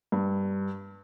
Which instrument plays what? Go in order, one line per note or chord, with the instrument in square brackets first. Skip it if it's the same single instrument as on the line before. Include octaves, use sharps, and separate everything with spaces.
[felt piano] G2